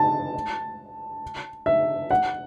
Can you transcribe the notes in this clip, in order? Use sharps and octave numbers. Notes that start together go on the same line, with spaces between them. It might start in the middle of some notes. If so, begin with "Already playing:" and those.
Already playing: A5
E5
F#5